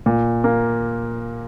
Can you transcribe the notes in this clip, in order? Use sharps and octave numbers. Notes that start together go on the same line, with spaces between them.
A#2
A#3